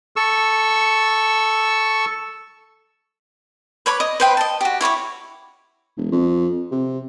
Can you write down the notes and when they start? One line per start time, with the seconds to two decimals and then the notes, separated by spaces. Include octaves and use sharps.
0.16 A4 C#6 E6
3.86 B4 C#5 B5 D6
4.00 D#5
4.20 B4 C5 G5 B5
4.37 D#5 A5
4.61 F#4 G4
4.81 E4 C#5 B5 D6
5.97 E1
6.12 F2
6.71 C3